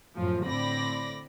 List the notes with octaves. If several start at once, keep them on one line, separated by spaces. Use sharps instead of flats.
F#2 A2 F3
A2 D3 C4 D5 B5 A#6